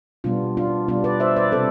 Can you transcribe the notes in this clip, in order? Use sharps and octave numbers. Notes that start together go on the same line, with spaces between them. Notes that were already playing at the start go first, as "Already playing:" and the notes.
B2 G3 B3 D4 F4
D4 F4
B2 G3 B3 D4 F4
B4 D5
C5 E5
B4 D5
C3 G3 C4 A4 C5